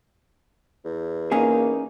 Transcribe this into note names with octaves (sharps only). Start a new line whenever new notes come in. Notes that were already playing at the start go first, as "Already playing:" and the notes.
E2
A#3 C#4 D#4 G#4